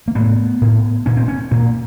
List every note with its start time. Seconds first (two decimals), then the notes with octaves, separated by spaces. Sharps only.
0.08 A#3
0.15 A2 B3
0.62 A2
1.06 A#2 C#4
1.17 C4
1.28 C#4
1.51 A#2 A#3